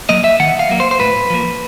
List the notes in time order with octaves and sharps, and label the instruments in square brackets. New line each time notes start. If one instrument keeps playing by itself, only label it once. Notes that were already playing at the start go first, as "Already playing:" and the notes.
[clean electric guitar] F#3 A#3 D#5
E5
D#3 F#5
F5
F#3 A#3
C5
C5
A2 B4
F3 A#3